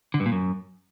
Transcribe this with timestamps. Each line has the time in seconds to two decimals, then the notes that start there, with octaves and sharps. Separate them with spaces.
0.14 D3
0.20 G2
0.26 A#2
0.32 F#2